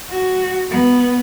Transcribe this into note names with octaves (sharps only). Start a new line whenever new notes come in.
F#4
B3